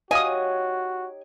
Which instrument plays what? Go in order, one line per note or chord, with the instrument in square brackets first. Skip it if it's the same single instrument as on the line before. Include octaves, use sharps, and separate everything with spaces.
[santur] D#4 G4 C#5 [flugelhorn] F#4 [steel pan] D#5 F5 D#6 [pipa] G#5